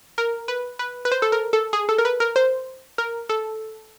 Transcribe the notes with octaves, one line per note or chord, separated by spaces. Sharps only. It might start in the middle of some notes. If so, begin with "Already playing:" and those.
A#4
B4
B4
B4
C5
A4
A#4
A4
G#4
A4
A#4
B4
A#4
C5
A#4
A4